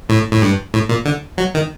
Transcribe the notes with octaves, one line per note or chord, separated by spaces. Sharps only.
A2
A2
G2
A2
A#2
D3
F#3
D#3